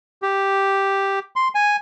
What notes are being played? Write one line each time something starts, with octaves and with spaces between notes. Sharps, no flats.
G4
C6
G#5